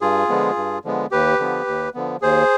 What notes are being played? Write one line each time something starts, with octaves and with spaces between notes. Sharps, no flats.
G2 F4 G#4
D3 F3 G#3 B3
G2
D3 F3 G#3 B3
D#2 G4 B4
D3 F3 B3
D#2
D3 F3 B3
D#2 G#4 C5